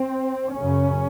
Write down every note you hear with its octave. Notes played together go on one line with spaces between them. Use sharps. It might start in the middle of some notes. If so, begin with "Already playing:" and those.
Already playing: C4
F#2 C#3 C#4